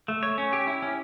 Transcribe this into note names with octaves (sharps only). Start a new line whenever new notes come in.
A3
C#5
C#4
G4
E4
C#4